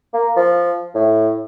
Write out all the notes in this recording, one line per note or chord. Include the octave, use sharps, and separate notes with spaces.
A#3
F3
A2